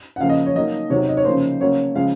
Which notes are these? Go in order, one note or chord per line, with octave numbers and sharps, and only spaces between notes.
F#5
C#3 F3 A#3 F5
D#5
C#5
D#3 F#3 A#3 D#5
C3 D#3 F#3 C#5
D#5
C#5
C#3 F3 A#3 C5
C#3 F#3 A#3 C#5
C#3 F3 G#3 F5